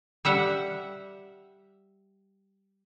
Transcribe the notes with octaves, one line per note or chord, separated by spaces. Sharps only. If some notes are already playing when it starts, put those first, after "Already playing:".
G3 E5 F#5